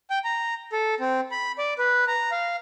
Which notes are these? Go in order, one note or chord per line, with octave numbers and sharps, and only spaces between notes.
G5
A#5
A4
C4
B5
D5
B4
A#5
F5